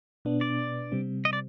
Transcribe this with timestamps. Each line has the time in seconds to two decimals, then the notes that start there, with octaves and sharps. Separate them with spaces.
0.25 B2 B3 D4
0.41 D5
0.92 C3 G3 C4
1.25 D#5
1.33 D5